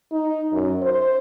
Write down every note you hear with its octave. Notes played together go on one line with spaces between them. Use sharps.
D#4
F#2
C5